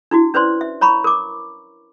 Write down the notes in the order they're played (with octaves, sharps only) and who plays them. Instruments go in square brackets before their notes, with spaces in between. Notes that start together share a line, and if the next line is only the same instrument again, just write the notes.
[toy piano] D4 E4 F#4
C#4 B4 C5 D5 C6
E5
C#5 A#5 B5 C#6
A#4 D6